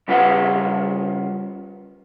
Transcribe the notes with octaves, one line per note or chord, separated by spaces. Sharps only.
C#3 G3 F4 B4 D#5 F#5